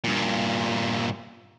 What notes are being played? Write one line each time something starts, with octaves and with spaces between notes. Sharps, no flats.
G2 A#2